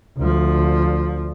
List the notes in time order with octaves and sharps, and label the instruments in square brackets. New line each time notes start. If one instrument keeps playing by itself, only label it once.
[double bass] D2 F3